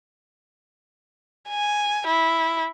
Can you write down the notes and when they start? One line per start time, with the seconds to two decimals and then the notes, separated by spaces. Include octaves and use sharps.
1.49 G#5
2.07 E4